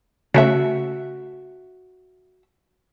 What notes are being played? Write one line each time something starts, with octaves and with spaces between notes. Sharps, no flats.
C#3 A3 F#4 E5